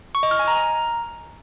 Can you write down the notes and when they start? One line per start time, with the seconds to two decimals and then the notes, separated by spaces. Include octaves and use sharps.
0.15 C#6
0.23 D#5
0.31 F6
0.39 G#5
0.48 A#5